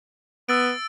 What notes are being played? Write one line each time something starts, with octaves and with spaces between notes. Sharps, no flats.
B3 E6 A6 D7